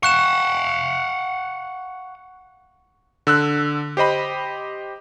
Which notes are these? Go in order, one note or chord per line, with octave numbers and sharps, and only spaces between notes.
F5 F#5 C#6 F#6 E7
D3 E6 F#6
G4 C5 D#5 B5